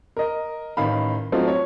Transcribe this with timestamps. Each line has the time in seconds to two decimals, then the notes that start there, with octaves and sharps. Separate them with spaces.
0.17 A#4 D#5
0.77 A1 D#3 F5 B5
1.32 F3 F#3 A3 C4 D#4 F4
1.48 C#5